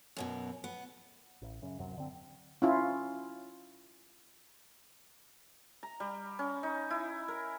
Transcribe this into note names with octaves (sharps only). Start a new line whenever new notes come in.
F#2 B2 E3
B3
A1
F#2 C#3
D1 F#2 C3 F#3
F#2 D3 C4
C#4 E4 F4
A#5
G3
C#4
D#4
E4
A#4